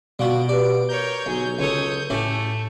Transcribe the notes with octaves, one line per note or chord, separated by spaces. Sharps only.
B2 G3 F4 F#4 D7
G4 B4 D5
A#4 C#5 G6
B1 G#4
C#2 A4 C#5 D#6
A2 A3 C#4 E4 G4